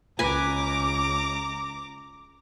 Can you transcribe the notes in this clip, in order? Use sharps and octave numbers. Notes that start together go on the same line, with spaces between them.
C#2 B4 G#5 A#5 D6